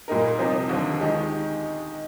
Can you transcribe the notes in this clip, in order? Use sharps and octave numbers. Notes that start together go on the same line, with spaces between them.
A#2 G3 A#3 D#4 A#4
C3 F3 C4 D#4
D#2 D3 F3
D#3 G#3 D#4 G4